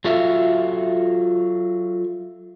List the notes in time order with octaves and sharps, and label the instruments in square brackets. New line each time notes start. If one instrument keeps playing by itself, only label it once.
[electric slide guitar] F#3 F4 F#4 A4 E5 F5